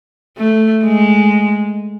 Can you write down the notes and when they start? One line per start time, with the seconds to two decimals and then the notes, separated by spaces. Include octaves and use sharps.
0.37 A3
0.84 G#3